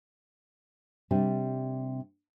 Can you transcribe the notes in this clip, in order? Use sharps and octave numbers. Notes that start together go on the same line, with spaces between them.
C3 G3 D4